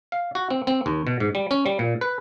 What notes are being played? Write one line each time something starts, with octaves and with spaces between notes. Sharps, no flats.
F5
F#4
C4
C4
D#2
B2
G#2
G3
C#4
G3
A#2
B4